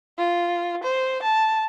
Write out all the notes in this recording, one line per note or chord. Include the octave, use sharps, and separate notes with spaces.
F4
C5
A5